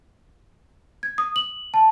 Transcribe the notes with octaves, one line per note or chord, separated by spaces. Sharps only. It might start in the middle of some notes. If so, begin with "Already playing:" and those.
G#6
D#6
F#7
A5